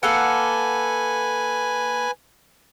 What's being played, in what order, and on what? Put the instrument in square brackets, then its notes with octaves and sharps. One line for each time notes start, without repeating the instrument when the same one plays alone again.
[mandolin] A#3 A4 F#5 [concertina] B4 G#5